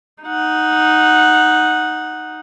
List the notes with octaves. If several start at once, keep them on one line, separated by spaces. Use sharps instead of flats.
D#4 F#5